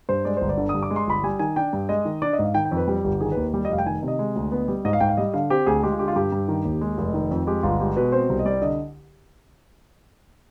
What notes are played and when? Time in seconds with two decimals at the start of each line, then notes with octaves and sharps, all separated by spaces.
0.09 G2 C5
0.25 G#3 D5
0.37 G1 C5
0.49 D5
0.57 D3
0.69 D#6
0.74 G2
0.83 D6
0.90 G#3
0.96 C6
1.07 G1 B5
1.23 G3 G#5
1.39 D#3 G#5
1.56 D4 G5
1.73 G2
1.89 G#3 D#5
2.05 D#3
2.22 D4 D5
2.33 D#5
2.39 G#2 F5
2.54 D#3 G5
2.65 G5
2.71 F2
2.77 B4
2.88 G3 G4
3.04 G1 G4
3.21 D#3 G#4
3.32 D#2 B4
3.54 G3
3.65 D#5
3.69 F1 F5
3.78 G5
3.86 D#3 G#5
4.03 C3
4.08 D#5
4.19 G#3
4.36 D2
4.52 B3
4.68 G3
4.85 G#2 D#5
4.93 F5
5.00 G#2 G5
5.09 F5
5.17 G3 D#5
5.34 D3 F5
5.50 C4 G4
5.66 D2 G#4
5.83 G#3 G4
5.91 F4
5.99 D3 G4
6.08 F4
6.16 G2 G4
6.32 G2
6.48 D#3
6.65 D#2
6.81 G#3
6.98 F1
7.14 D#3
7.31 F2
7.47 G#3 G4
7.63 G1 F4
7.80 G#3 G4
7.96 B2 B4
8.12 C4 C5
8.29 C2
8.39 D#5
8.45 G3 D5
8.62 D3 D#5